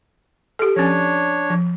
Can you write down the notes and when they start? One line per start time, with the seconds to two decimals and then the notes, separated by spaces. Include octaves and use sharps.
0.59 G4 A4
0.76 F3 C#4 D4 C#5
1.50 F3